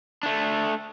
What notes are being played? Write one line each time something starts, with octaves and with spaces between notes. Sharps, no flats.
A3 D4